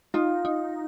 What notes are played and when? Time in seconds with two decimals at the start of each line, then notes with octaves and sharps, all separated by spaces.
0.14 D#4 F4
0.45 D#4